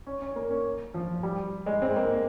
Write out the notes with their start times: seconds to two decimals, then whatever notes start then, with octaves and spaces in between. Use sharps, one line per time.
0.07 C#4
0.21 C#4
0.36 A#3
0.50 C#4
0.94 F3
1.23 G3
1.66 G#3
1.82 C4
1.90 G#3
1.96 A#3
2.11 A#3